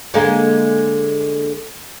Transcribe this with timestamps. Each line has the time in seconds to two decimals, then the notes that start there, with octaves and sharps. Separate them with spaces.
0.14 D3 G#3 A#3